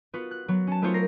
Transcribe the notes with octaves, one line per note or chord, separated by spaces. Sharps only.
B3 F4 F#4 B4
F#6
F#3 B3
C#4 A5
A3 B3 D#4 F4 C5 C#5
A#4 A#6 C7